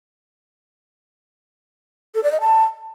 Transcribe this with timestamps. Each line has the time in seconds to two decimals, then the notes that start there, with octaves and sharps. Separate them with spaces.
2.15 A4
2.23 D5
2.32 D#5
2.41 A5